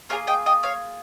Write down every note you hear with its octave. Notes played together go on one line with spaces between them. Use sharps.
A#3 F4 G#4 A#4 C#5
D#5 G5
D#5 G5
C#5 F5